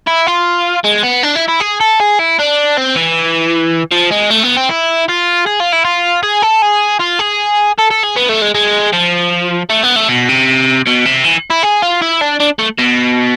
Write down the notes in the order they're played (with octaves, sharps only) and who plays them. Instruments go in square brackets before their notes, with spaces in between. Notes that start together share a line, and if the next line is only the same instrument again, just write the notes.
[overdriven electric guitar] E4
F4
G#3
B3
D4
E4
E4
G#4
A4
G#4
E4
D4
C4
E3
F3
G#3
A3
B3
C4
E4
F4
G#4
F4
E4
F4
G#4
A4
G#4
F4
G#4
A4
A4
G#4
B3
A3
G#3
G#3
F3
A3
B3
A3
B2
C3
B2
C3
E3
E4
G#4
F4
E4
D4
D4
A3
B2